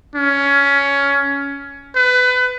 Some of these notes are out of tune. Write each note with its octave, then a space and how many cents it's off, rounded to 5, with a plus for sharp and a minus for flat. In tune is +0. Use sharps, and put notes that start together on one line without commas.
C#4 +15
B4 +25